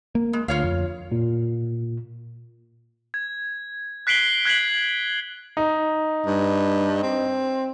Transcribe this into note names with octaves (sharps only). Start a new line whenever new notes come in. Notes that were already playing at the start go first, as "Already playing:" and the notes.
A#3
G#3
D2 F4 C#5 F5
F2
A#2
G#6
F#6 B6 C7 D7 F#7 G7
F#6 G#6 B6 C7 F#7
D#4
G2
C4